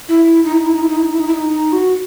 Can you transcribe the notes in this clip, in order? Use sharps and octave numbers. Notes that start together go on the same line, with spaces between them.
E4
D#4
E4
D#4
E4
D#4
E4
D#4
E4
D#4
E4
D#4
E4
D#4
D#4
F#4